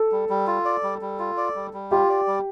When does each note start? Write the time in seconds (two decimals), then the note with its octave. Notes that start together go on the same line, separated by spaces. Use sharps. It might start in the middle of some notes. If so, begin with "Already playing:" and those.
Already playing: A4
0.12 G3
0.29 G3
0.47 F4
0.65 D5
0.83 G3
1.01 G3
1.19 F4
1.37 D5
1.55 G3
1.73 G3
1.91 F4 G4
2.09 D5
2.27 G3